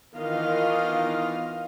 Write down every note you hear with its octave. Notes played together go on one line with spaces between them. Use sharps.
D#3 E3 B3 F4 D#5 F5